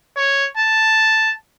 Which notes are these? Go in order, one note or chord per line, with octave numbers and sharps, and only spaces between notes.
C#5
A5